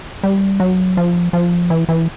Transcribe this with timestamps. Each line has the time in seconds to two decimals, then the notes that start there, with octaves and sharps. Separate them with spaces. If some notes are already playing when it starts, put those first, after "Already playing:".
0.23 G3
0.60 F#3
0.97 F3
1.33 F3
1.70 E3
1.89 E3